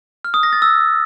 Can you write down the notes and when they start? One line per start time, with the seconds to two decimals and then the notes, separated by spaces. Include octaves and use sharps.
0.25 F6
0.34 D#6
0.43 A#6
0.53 A6
0.62 E6